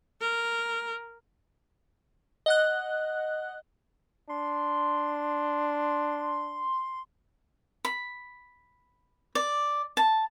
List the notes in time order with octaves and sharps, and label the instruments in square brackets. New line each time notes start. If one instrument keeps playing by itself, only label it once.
[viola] A#4
[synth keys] D#5 F#5 F#6
[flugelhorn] D4 [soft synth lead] C6
[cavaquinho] B5
D5
A5